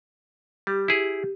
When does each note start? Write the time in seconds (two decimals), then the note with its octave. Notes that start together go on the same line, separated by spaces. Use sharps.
0.67 G3 G4
0.88 E4 G#4